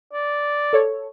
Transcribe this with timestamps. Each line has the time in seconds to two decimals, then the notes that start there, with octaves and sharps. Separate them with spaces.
0.13 D5
0.73 A4 C#5